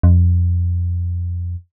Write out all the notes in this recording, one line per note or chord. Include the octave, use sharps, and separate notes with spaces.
F2